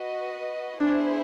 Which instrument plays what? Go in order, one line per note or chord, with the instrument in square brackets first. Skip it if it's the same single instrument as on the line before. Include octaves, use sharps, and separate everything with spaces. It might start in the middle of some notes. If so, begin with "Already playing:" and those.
Already playing: [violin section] F#4 B4 D#5
[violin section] B3 E4 G#4 C5 E5 [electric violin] D4